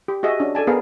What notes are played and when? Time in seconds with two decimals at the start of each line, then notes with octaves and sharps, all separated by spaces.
0.08 G4
0.23 F#4 G#4 D#5 E5
0.39 C#4 D4 F#4
0.55 A4 D5 G#5 A5
0.67 B3 G#4 A#4 F5